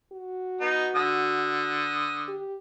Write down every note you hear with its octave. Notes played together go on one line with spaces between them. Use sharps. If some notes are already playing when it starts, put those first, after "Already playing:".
F#4
B3 D#4
D3 D#6
G4